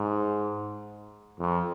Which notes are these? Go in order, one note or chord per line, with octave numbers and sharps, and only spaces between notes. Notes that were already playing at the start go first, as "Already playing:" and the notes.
Already playing: G#2
F2